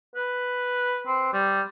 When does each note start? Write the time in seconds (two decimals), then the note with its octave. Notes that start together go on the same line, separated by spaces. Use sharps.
0.16 B4
1.06 C4
1.33 G3